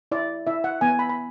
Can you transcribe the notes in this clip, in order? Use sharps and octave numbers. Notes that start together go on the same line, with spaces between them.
E4 D5
E4 E5
F#5
B3 G#5
B5
B5